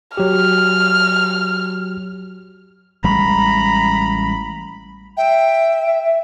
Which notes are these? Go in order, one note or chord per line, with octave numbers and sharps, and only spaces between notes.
F#3 G4 F6
A1 G3 G#3 A#5 B5
E5 G5